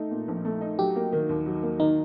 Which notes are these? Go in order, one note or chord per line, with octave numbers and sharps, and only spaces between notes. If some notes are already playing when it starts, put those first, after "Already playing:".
Already playing: A3 D#4
A#2
A#1
A3
D#4
F#3 G4
A#3
D#3
D#2
F#3
A#3
D#3 D#4